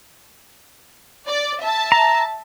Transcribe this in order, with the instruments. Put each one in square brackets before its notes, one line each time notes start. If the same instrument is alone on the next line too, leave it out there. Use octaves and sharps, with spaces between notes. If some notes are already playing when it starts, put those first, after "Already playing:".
[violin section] D5
E5 A5
[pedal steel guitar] A#5